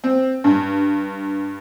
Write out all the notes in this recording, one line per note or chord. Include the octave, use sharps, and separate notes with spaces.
C4
G2